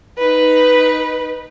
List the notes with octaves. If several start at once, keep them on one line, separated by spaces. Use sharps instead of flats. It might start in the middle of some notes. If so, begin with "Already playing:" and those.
D#4 B4